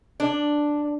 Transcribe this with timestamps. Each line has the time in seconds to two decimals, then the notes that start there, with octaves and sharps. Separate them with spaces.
0.20 D4